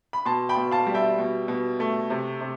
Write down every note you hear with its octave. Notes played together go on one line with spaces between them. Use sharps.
B5
B2 A5 C6
G5 B5
B2
F5 A5
G3
E5 G5
B2
B2
A3
C3
C3